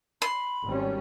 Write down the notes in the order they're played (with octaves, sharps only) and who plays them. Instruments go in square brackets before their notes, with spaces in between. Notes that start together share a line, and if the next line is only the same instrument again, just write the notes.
[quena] B5 [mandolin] C6
[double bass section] G#1 G3 C#4